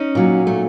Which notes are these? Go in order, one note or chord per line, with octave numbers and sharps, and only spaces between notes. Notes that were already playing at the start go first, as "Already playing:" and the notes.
Already playing: C#4 D#4
A#2 F#3
A3